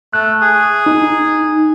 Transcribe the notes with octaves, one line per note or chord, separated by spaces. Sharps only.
A3 F#6
G#4
D#4